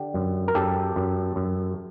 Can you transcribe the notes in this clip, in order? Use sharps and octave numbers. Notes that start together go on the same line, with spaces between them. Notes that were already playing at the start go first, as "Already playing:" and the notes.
Already playing: D3 G4
F#2
A#4
F#2 G4 A4
F#2
F#2